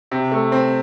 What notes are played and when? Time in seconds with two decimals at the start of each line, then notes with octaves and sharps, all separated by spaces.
0.11 C3
0.32 A3
0.52 C4